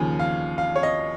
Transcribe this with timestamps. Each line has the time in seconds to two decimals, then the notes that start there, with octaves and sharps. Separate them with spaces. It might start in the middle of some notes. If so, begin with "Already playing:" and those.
Already playing: D#2 C#3 F3 G#5
0.19 F5
0.58 F5
0.76 C#5
0.83 D#5